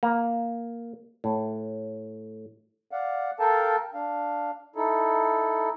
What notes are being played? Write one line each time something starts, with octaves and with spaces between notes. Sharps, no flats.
A#3
A2
D5 F5 F#5
A4 A#4 F5 G5 A5
D4 F5
D#4 E4 A4